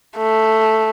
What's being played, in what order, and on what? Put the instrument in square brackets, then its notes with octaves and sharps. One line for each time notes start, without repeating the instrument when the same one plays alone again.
[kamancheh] A3